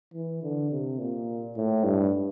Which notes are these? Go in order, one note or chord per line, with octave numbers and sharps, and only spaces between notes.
E3
D3
C3
A#2
A2
G2